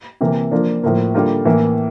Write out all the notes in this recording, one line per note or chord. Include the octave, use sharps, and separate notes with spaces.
C3 E3 A#3
F3 A#3 D4 F4
A2 F3 A#3
D3 G3 A#3 F4
A2 E3 A#3